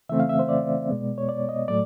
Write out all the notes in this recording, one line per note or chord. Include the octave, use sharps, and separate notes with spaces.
C#3 E3 A3 C4 E5
F5
E5
C5
D5
B2 G#3 B3
C#5
D5
D#5
A2 F#3 A3 D5